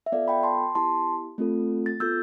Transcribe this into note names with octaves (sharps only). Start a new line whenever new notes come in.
E5
B3 F4 A4 D5 F5
G5 B5
A5 C6
B3 E4 G4 A5 C6
A3 C4 F4 A4
A6
B3 F4 A4 E6 G6